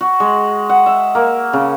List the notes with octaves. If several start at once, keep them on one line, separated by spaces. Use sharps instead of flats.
F#4
G#3
F#5
E5
A#3
C#3